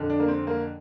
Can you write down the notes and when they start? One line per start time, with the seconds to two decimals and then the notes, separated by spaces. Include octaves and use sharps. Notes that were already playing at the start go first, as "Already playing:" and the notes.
Already playing: F2 D3
0.10 D4
0.20 A#3
0.28 C4
0.47 A#3